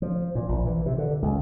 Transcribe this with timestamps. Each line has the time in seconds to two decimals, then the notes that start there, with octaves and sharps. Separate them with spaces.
0.02 F3
0.35 A#2
0.49 A#1
0.66 E3
0.86 C3
0.98 D3
1.22 C#2